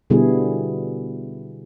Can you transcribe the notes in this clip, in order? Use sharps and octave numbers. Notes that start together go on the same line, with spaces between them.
B2 D3 G3 B3 E4 G#4